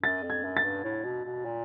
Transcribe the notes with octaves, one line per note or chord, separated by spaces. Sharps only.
F#2 A6
F2
G#6
F#2
A6
G2
A2
B2
B2
A#2